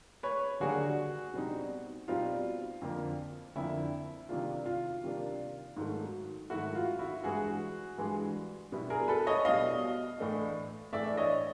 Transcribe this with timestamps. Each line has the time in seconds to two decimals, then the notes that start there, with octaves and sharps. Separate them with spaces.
0.23 B4 C#5
0.60 D#2 D3 G3 A#3 D4 F#4 G#4
1.34 B2 G3 C4 D#4
2.08 B2 G3 C4 D#4 F4
2.82 F2 D3 F3 A#3
3.55 F2 D3 F3 A#3 E4
4.29 C3 D#3 G3 A#3 D4 F4
4.66 F4
5.03 C3 D#3 G3 A#3 D4
5.77 G#2 D#3 F#3 A3
6.50 G#2 D#3 F#3 A3 E4 F#4
6.75 F4
6.99 E4 F#4
7.24 G2 E3 G#3 F#4 G#4
7.98 G2 E3 G#3
8.72 B2 G3 B3 E4
8.90 G#4 A#4
9.08 A4 B4
9.27 C#5 D#5
9.45 B2 G3 B3 E4 D#5 F5
10.19 A2 E3 A3 D4
10.93 A2 E3 A3 D4 D5 E5
11.17 C#5 D#5